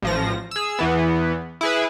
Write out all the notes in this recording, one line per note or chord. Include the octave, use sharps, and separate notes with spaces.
A1 F3 A#6
G#4 E6
E2 E3 B3
E4 G#4 B4